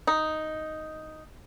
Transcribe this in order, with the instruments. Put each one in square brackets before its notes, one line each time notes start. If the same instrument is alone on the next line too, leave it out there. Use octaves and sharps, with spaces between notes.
[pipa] D#4